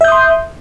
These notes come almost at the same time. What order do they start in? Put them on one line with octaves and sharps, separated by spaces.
E5 G6 D#6 C6